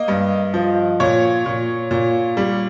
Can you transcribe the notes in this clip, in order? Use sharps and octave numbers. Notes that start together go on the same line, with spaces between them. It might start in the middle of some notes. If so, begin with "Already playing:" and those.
Already playing: A#3 D#5
G2
F3
A#2 C#5
A#2
A#2
G3